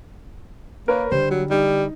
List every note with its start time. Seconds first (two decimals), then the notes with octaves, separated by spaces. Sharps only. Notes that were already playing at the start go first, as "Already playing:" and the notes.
0.88 A#3 A#4 B4 C#5
1.11 D3 G3 C5
1.30 F#3
1.50 G3 D#4